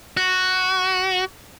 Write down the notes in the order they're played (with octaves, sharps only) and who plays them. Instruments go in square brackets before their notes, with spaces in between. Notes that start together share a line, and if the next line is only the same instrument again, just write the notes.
[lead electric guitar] F#4